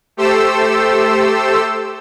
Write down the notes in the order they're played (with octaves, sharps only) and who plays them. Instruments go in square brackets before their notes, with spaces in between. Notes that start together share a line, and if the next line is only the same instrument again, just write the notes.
[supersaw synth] A3 G4 A4 C5 E6